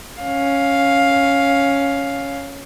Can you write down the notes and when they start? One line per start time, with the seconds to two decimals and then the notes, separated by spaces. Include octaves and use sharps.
0.21 C#4 F5